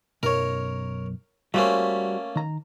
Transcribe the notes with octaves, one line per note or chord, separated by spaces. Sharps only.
B1 F#2 A#4 C#5
G3 A3 A#3 C#4 F#4 C5
D#3 A#5